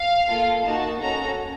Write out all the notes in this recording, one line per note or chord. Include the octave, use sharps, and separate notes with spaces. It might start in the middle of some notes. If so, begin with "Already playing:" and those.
Already playing: F5
A#3 F4 A4
A#3 D#4 F#4 A5
C#4 F#4 A4 A#5